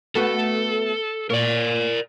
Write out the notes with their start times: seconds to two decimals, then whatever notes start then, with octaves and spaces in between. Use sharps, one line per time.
0.15 A3 B3 F#4 A4
1.30 A#2 A#4 C#5 D5